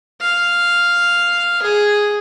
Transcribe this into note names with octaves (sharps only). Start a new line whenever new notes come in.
F5
G#4